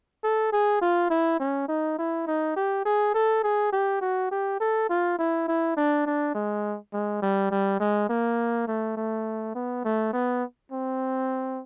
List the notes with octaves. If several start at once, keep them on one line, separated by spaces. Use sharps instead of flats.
A4
G#4
F4
E4
C#4
D#4
E4
D#4
G4
G#4
A4
G#4
G4
F#4
G4
A4
F4
E4
E4
D4
D4
G#3
G#3
G3
G3
G#3
A#3
A3
A3
B3
A3
B3
C4